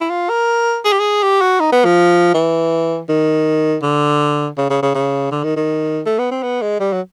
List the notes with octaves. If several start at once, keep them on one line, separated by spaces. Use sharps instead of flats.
E4
F4
A#4
G#4
G4
G#4
G4
F#4
D#4
B3
F3
E3
D#3
D3
C#3
C#3
C#3
C#3
D3
D#3
D#3
A3
B3
C4
B3
G#3
G3
F#3